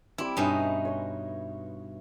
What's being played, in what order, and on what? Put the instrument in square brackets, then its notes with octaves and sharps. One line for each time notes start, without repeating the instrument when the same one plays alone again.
[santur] G3 C4 D6 [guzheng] E4
[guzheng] G2 B2 D#4 [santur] C#4 E5
[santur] C#5 C6